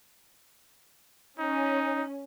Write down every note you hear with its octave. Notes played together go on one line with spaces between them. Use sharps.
C#4 D#4